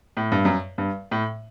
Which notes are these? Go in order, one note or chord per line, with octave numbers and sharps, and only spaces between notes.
A2
G2
F#2
G2
A2